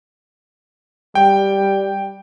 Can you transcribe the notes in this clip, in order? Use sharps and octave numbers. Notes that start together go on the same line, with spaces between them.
G3 G5